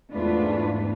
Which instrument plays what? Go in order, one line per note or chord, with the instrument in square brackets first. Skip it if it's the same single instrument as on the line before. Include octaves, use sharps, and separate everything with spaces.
[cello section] E2 G#2 A3 D4 F4 B4